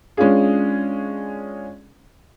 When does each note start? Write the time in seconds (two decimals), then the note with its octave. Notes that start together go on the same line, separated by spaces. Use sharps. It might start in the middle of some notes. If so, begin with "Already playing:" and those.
0.17 G#3 C#4 D4 F4 G#4